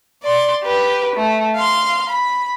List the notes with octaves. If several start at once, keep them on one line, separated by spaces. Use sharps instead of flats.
D5 C6
G4 B4
A3
F5 C6
B5